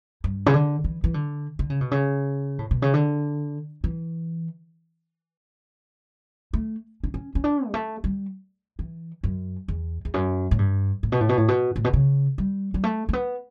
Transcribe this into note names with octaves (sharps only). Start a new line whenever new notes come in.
G2
C#3
D3
E3
E3
D3
D3
C#3
B2
C#3
A2
B2
C#3
D3
E3
A3
D4
C#4
C#4
D4
G3
A3
G3
E3
F#2
E2
E2
F#2
A2
G2
A2
B2
A2
B2
A2
B2
A2
B2
C#3
G3
G3
A3
A3
B3